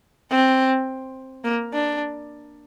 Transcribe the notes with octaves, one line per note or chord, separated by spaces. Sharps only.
C4
A#3
D4